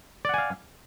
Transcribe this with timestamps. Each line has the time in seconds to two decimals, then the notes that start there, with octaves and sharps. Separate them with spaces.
0.25 D5
0.29 F#5
0.34 G#5
0.38 F5